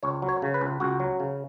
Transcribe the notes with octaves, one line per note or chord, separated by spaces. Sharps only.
C#2 C#5
F#3
C#5
C#3
B4
C#2
C#2 F#4
F#3
C#3